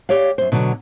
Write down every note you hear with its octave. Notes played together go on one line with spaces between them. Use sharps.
G4 C#5 D5 F5
F#2 C5
B2 D3 F#3